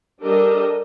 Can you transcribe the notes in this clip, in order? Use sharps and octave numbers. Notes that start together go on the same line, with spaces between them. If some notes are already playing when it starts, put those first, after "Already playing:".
G3 D4 G4 A4 A#4 D#5